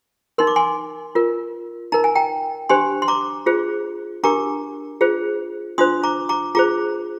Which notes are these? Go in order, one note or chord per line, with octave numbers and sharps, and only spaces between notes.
D#4 A#4 C6
D6
G#5 C6
F4 A#4
D#4 A#4 A#5
G#5
G5 A#5
D4 G4 C5 G#5 C6
C6
A#5 D6
F4 G#4 C5
D4 G4 A#4 A#5 D6
F4 G#4 C5
D4 F4 C5 C6 D#6
A#5 D6
A#5 D6
F4 G#4 C5 A#5 D6